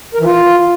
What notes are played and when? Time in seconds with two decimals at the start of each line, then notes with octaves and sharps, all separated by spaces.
0.14 A#4
0.20 E3
0.26 F4